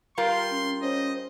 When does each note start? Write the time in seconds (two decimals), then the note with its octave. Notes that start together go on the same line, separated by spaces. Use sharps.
0.18 G3 F4 A#4 C6
0.51 C#4
0.82 C#4 C5 D#5